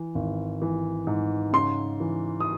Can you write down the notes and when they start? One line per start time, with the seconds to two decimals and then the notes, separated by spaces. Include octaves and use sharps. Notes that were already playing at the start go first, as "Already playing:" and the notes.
Already playing: E3
0.15 G#1
0.62 E3
1.07 G#2
1.53 C#3 C6
2.00 E3
2.40 D#6